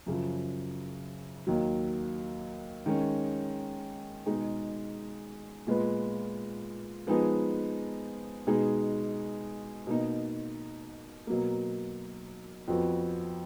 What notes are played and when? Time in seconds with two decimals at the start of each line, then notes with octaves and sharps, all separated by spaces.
0.06 F#2 C#3 F3
1.47 D#2 D#3 F#3
2.86 D#3 G#3 C#4
4.26 B2 G#3 D#4 G#4
5.67 A#2 G#3 B3 F4 B4
7.07 F3 G#3 B3 D#4 G#4
8.47 B2 G#3 D#4 G#4
9.87 B2 A#3 D#4
11.27 B2 F#3 A#3
12.68 F2 F3 B3 F#4